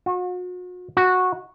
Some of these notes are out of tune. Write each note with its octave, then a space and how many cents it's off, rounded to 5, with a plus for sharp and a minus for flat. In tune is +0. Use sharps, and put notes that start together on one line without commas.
F#4 -40
F#4 -10